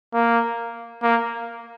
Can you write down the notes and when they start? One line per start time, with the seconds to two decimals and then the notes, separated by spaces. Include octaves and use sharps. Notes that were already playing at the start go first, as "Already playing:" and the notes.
0.14 A#3
1.02 A#3